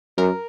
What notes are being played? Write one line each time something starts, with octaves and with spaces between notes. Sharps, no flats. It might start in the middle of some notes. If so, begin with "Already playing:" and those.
F#2 A#4